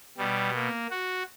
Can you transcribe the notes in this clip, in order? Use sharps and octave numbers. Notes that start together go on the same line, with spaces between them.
B2 G3
A#3
F#4